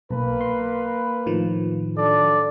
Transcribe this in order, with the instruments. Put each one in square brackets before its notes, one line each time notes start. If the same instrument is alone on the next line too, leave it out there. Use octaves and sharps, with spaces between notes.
[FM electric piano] B1 [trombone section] A#3 B4
[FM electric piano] C6
A2 D#3 F3
[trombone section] F#3 D4 A4 [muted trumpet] D5